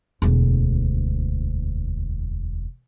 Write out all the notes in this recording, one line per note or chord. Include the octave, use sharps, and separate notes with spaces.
E1 D2